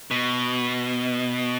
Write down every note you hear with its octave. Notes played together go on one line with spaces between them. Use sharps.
B2